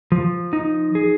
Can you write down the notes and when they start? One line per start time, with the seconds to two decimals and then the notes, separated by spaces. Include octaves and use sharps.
0.12 F3
0.53 D#4
0.95 G#4